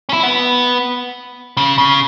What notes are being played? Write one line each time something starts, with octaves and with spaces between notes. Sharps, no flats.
C#4
E4
B3
C#3
C#3